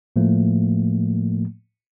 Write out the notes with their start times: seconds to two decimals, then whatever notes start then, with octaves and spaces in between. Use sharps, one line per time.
0.16 A2 F3 A3 A#3